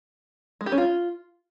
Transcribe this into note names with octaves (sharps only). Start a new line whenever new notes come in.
G#3
G4
C#4
F4